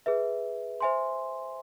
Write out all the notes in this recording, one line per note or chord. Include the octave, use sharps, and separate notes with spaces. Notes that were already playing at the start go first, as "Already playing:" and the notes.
G#4 B4 E5
C5 E5 G#5 C6